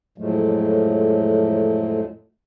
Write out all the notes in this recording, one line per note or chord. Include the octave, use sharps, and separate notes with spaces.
F2 A2 F3 F#3 G#3 A3